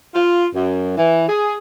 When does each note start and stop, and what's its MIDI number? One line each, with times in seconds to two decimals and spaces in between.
0.15 0.46 65
0.54 0.95 42
0.97 1.27 52
1.28 1.57 68